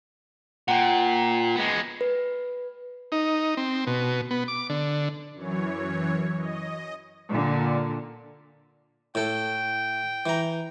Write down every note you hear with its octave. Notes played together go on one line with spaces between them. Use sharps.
A#2 F#5 G5
G#3 B3
B4
D#4
C4
B2
B3
D6
D3
F#2 E3 C#5
D#5
A#2 D3
A2 A4 G5
E3 A#5